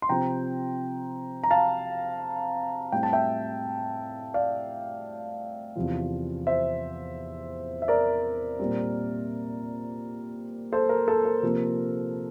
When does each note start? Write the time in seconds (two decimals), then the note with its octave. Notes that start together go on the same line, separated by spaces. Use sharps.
0.02 C6
0.09 C3 F3 C4 G5 A#5
1.44 A#5
1.51 F5 A5
2.92 A2 G3 C4 G5
3.03 A5
3.13 E5 G5
4.34 D5 F5
5.76 E2 C3 F3
6.47 C5 E5
7.82 E5
7.88 A#4 D5
8.60 A#2 G3 C4
10.73 A4 C5
10.89 A#4
11.08 A4
11.25 A#4
11.43 C3 F3 A#3